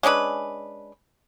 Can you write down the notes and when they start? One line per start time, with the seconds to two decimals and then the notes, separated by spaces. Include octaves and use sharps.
0.03 G#3 C#4 D4 B4